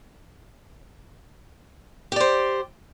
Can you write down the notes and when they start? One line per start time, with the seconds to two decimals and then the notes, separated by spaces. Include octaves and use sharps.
2.12 G4
2.16 D5
2.20 C5